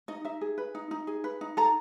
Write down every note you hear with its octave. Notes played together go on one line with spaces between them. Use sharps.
D#4 D#5
D#4 E5
G#4
B4
D#4
D#4
G#4
B4
D#4
A4 A#5